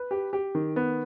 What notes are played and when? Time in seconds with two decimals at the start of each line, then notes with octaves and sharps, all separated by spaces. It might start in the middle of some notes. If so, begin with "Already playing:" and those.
Already playing: B4
0.11 G4
0.33 G4
0.55 D#3
0.76 B3